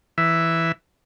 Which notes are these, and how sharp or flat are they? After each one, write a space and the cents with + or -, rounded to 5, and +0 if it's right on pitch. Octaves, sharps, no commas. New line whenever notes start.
E3 +0 E5 +0